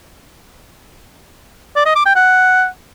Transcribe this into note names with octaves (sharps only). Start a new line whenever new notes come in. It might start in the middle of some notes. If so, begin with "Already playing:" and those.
D5
D#5
D6
G5
F#5